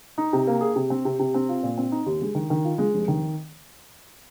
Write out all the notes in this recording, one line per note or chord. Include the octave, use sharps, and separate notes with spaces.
D#4
C3
A#3
G#4
C3
C4
C3
C3
C4
F4
A#2
C4
D#4
D#2
G#3
D#3
D#3
F4
G#3
F1
D#3